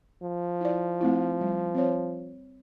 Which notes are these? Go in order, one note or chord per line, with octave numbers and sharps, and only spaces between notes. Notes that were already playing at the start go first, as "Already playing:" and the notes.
F3
E4 D5
A3 C4 E4
G3
C4 C5 C#5